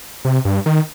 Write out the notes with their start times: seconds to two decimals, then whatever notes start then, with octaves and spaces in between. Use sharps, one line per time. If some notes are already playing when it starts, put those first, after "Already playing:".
0.25 C3
0.45 G2
0.66 D#3